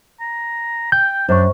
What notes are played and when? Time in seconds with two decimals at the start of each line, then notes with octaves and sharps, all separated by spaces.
0.21 A#5
0.92 G5 G6
1.29 F#2 D4 C5 C#6